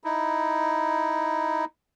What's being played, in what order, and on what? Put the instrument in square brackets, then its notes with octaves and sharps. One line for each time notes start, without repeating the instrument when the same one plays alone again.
[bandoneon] D#4 E4